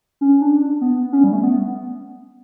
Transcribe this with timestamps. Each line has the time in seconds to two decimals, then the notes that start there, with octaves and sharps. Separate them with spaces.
0.21 C#4
0.41 D4
0.61 D4
0.81 B3
1.13 C#4
1.24 G3
1.33 A3
1.43 B3